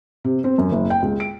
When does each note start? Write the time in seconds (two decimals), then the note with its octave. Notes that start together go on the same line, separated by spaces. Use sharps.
0.24 C3
0.44 C4
0.58 F#2
0.71 F#1
0.90 G5
1.02 C#2
1.20 D7